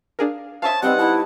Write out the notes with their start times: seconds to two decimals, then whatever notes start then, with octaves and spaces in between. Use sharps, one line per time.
0.19 D4 G#4 A#4 F5
0.62 C5 C#5 E5 F5 A5 D#6
0.82 G3 B3 C4 D#4 F#5
0.98 E4 D#5 A5